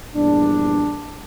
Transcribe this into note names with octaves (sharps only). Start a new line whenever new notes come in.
A#1 E2 G2 D4